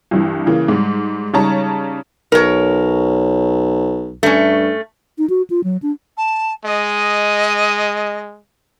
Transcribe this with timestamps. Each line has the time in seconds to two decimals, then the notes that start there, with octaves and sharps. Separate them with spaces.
0.11 C2 G2 E3
0.46 C#3 E3 A#3
0.68 G#2 G3
1.33 C#3 G3 D#4 C#5 A5 A#5
2.32 B1 A#4 C#5
4.23 G2 A3 C#4
5.18 D#4
5.30 F#4
5.50 F4
5.64 F#3
5.82 D4
6.17 A5
6.65 G#3 D#5